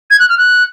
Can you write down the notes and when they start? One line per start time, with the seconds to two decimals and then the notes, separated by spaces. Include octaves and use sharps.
0.11 G#6
0.19 F#6
0.29 F6
0.38 F#6